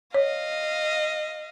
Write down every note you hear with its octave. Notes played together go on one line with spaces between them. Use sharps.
C#5 D#5 F5